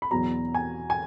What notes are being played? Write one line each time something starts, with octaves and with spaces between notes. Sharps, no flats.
B5
E2 B2 F#3 A#5
G#5
G#5